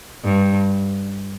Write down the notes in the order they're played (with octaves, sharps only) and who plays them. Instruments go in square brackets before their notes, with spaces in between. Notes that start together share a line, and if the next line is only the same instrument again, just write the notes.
[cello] G2